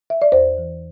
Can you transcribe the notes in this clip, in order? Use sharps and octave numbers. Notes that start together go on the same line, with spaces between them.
E5
D5
E2 C5
E3